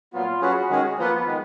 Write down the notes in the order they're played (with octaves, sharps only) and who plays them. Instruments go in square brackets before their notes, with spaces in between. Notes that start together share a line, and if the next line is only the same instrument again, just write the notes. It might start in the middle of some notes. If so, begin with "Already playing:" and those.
[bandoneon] A#2 F#3 B3 [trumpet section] F4
[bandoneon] F#3 C#4 G#4 B4 [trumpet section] F#4
[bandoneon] D#3 G#3 C#4 G#4
[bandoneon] F3 A#3 F4 B4 [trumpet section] B3
[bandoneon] D#3 G#3